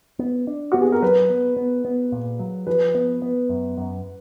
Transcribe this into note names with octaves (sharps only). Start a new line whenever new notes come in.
B3
D4
B3 F#4
G#4
A#4
F#3 B4
B3
B3
B3
A#2
F#3
F3 B4
B3
B3
F#2
F#2